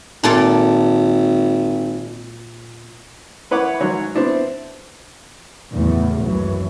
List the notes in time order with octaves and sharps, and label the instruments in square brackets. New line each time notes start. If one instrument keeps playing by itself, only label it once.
[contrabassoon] G#1 [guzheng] A#2 A4 D5
[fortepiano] E4 B4 C#5 F#5 D6
G#2 F#3 C#5 F#6
B3 C4 D4 E4
[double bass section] G#1 E2 A2 C#3 F#3 A3
G#1 C#2 F#2 E3 F#3